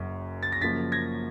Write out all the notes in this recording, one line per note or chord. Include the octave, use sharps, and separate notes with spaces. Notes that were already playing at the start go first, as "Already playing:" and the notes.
Already playing: F#1 F#2
A6
A#6
F#2 C#3 F3 A#3 A6 B6
G#6 A#6